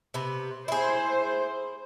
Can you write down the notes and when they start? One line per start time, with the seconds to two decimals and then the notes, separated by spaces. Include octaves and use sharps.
0.14 C3 B3
0.68 E4 G#4 C5